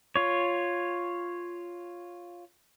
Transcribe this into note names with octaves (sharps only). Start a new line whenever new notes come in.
F4 C#5